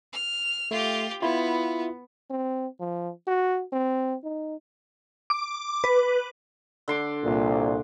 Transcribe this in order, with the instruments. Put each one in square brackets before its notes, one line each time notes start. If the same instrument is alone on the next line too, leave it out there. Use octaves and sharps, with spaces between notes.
[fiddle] F6
[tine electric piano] A3 [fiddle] F4 G4
[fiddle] B3 [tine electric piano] E4 F4
[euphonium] C4
F3
F#4
C4
D#4
[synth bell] D6
B4
[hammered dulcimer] D3 C6 D6
[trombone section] C2 A#2